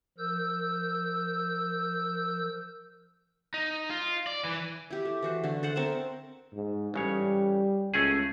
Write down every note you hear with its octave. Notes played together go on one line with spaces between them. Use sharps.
F3 A#4 E6 G6
D#4
F4
D5
E3
E4 G4
A3
E3 F#4 C5
D3 A3
A4 C5 F#5
C4 A#4 E5 A5
G#2
A1 C#3 G3 C#5
C#2 A3 C#4 G#4